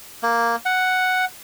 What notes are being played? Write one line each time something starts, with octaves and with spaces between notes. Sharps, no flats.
A#3
F#5